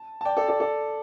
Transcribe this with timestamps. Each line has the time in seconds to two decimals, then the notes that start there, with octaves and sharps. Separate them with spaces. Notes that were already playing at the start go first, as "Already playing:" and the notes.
Already playing: A5
0.21 A5
0.25 D5 G5
0.36 A4 D5
0.48 A4 D5
0.60 A4 D5